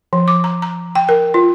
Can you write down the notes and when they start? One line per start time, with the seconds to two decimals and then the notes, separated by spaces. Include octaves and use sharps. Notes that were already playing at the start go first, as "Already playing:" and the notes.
0.13 F3
0.28 D6
0.44 A#5
0.62 A#5
0.95 G5
1.09 A#4
1.34 F4